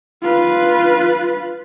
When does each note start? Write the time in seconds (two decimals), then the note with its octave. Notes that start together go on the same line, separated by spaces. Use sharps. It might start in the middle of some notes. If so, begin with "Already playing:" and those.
0.22 F4 B4